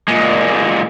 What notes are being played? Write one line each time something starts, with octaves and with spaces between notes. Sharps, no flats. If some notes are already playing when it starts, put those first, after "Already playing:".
A#2 G#3